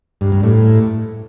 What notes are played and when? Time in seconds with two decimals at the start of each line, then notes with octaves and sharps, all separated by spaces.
0.21 G2
0.32 G2
0.43 A2